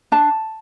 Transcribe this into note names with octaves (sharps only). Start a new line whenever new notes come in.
D4 A5